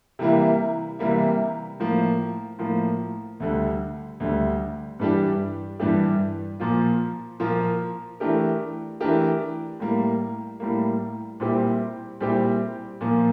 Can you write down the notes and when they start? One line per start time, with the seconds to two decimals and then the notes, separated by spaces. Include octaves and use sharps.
0.19 C3 E3 G3 A#3 E4
0.99 C3 E3 G3 A#3 E4
1.80 A2 F3 A#3
2.59 A2 F3 A#3
3.40 D2 D3 G3
4.20 D2 D3 G3
4.99 G2 E3 G3 D4 G4
5.80 G2 E3 G3 D4 G4
6.60 A#2 F3 A#3 F4
7.40 A#2 F3 A#3 F4
8.20 E3 A3 D4 G4 A#4
9.00 E3 A3 D4 G4 A#4
9.80 A2 G3 A#3
10.60 A2 G3 A#3
11.40 A#2 G3 C4 E4 G4
12.20 A#2 G3 C4 E4 G4
13.01 A#2 F3 A#3